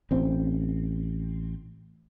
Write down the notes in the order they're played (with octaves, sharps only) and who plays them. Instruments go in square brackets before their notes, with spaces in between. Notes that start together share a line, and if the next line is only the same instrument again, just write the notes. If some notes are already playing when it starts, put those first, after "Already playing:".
[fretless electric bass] A1 C4